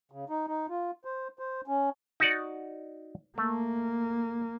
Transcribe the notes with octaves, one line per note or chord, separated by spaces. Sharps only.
C#3
D#4
D#4
F4
C5
C5
C#4
D#4 F#4 D5
A3 A#3